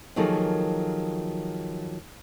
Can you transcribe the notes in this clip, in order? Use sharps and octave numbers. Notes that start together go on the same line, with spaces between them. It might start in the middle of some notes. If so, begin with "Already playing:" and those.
D#3 F3 F#3 A#3 G#4 A4